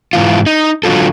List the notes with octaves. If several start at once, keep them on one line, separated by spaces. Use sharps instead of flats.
G#2 E3 F4
D#4
D3 F#3 F4 A4